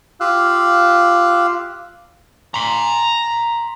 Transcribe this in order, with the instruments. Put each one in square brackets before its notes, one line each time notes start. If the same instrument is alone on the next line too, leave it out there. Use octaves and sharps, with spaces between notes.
[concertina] F4 G4 F5 E6 F#6
[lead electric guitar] A#5 C6